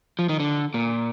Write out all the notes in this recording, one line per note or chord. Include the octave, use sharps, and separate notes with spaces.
F3
D#3
D3
A#2